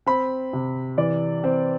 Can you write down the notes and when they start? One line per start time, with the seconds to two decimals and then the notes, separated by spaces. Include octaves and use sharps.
0.07 C4 B5
0.53 C3
0.97 E3 D5
1.44 C4